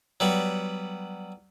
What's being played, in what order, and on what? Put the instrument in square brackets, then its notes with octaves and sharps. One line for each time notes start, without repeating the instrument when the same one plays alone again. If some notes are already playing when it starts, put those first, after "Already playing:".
[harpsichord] F#3 G3 B3